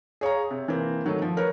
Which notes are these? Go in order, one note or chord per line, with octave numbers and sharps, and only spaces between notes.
G#4 C#5 F5 A#5
C3
E3 A#3 C4
D#3 F#3 A3
F3
A#4 B4 C#5